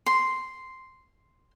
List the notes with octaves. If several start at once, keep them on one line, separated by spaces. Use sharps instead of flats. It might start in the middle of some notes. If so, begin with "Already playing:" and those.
C6